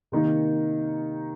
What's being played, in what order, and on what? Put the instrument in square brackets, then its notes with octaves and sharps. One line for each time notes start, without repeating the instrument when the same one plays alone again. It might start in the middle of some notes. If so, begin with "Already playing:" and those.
[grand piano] C3 D#3 A#3 D#4